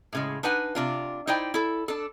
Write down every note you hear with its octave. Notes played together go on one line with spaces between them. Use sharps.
A2 C#3 G#3
D4 D#4 B4 F#5 G#5
C3 D4 F4
D#4 E4 C5 D5 G5
E4 A4
D4 A4